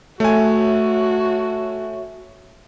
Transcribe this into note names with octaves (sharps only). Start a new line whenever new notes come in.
A3 F#4 C#5 E5 G#5